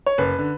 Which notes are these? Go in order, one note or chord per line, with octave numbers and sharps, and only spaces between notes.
C#5
F#1 B4
D3